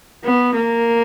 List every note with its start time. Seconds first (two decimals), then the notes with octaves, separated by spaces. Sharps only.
0.24 B3
0.55 A#3